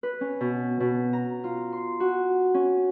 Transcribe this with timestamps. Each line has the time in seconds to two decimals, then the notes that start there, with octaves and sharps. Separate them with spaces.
0.03 B4
0.21 C#4
0.41 B2
0.80 B2
1.13 A#5
1.44 F4
1.73 C6
2.00 F#4
2.54 C#4